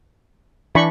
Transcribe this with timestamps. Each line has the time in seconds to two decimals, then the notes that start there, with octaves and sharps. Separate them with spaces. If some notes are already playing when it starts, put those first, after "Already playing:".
0.75 E3 D4 B5 C#6